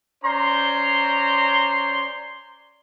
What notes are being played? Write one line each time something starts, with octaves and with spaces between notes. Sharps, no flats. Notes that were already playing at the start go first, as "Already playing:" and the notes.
C#4 C5 D5 A#5 C6